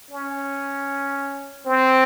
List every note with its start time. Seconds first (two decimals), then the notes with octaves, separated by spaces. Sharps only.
0.11 C#4
1.66 C4